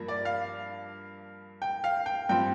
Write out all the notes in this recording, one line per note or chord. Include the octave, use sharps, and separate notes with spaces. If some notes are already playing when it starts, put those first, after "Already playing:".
Already playing: G2 F3 A#3
D5
F5
G5
F5
G5
G2 F3 C4 G5